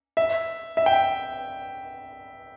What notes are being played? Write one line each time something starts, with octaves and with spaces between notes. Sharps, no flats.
E5
E5
G5